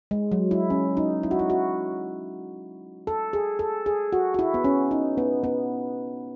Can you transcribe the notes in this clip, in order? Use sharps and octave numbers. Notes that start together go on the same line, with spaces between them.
G#3
F#3
E4
C#4
D#4
E4
F#4
E4
F#4
A4
G#4
A4
G#4
F#4
F#4
E4
B3
C#4
D#4
B3
B3